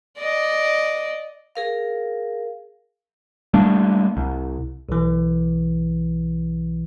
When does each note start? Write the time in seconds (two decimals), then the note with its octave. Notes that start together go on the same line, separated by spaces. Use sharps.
0.19 D5 D#5
1.55 G#4 A#4 F5
3.54 G3 A3 A#3 D4
4.17 C2
4.89 B1 E3